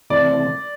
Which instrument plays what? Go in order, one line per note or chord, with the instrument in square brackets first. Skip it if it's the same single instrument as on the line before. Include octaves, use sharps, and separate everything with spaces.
[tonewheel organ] C3 E3 A3 C4 [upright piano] D5